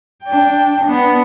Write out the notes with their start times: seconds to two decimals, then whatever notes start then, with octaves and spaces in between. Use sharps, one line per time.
0.24 D4 G5
0.85 B3 D4